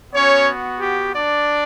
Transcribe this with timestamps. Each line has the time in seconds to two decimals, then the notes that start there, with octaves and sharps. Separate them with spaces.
0.14 B3 C#4 F#4 C#5
0.79 G4
1.12 D4 D5